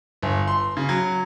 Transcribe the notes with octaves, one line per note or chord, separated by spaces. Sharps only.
G1
C6
C#3
F#3